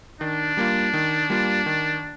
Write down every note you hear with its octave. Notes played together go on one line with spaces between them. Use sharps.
D#3 D4
G3 A#3 F4
D#3
G3 A#3 F4
D#3